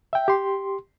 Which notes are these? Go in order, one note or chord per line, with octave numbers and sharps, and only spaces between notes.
E5 G5
G4 C6